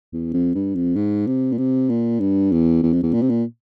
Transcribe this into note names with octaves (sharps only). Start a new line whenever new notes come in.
E2
F2
G2
F2
G#2
C3
A#2
C3
A#2
G2
E2
E2
F2
E2
A#2
C3
A#2